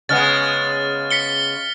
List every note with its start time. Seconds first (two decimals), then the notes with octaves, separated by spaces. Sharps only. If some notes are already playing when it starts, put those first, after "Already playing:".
0.09 C#3 G#3 B3 F6 A6
1.11 B6 C#7 G7